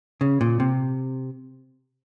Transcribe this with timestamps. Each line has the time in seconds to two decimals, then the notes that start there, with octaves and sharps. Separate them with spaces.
0.21 C#3
0.41 A#2
0.60 C3